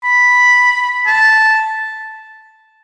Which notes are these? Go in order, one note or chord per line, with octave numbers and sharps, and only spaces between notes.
B5
A5